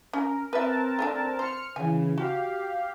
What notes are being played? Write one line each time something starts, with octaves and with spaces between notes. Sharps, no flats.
C#4 A#4
C4 A#4 B4 E5 A5
A3 B3 D4
C5 F6 C#7
C#3 E3 G#5
F#4 G4 F5